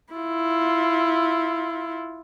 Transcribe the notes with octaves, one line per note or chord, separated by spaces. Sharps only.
E4 F4